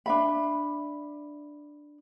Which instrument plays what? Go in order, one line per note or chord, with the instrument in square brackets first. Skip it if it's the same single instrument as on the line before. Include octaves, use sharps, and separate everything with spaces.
[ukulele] D4 E5 B5